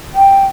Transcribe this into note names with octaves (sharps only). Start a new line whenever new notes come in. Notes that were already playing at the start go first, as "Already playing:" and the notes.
G5